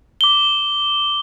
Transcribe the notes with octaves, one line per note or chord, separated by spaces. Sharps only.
D6 G7